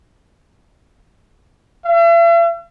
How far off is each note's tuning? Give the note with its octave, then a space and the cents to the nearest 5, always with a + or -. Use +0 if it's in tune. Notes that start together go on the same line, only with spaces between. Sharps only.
E5 +45